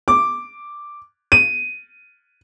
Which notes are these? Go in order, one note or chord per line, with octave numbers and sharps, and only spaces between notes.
D6
D#7